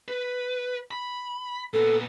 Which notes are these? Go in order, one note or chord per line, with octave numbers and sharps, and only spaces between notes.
B4
B5
A#2 B3 A4